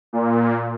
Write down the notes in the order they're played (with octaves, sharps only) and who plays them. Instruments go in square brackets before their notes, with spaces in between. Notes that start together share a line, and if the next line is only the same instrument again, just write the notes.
[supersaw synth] A#2